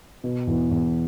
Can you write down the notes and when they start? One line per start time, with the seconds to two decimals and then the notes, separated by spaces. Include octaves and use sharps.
0.24 B2
0.47 E2
0.71 E2